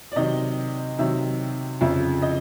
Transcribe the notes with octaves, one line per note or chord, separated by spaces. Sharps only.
D5
C3 D#3 F#3 D#5
C3 D#3 F#3 E5
F2 C#3 F3 E5
D#5